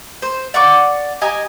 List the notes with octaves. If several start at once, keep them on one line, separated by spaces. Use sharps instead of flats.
C5
D5 F#5 C#6 D6
G4 D#5 G#5 A#5